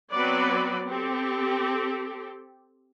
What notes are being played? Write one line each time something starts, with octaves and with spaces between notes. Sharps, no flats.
F#3 B3 C4 B4 D5
C4 G4 A4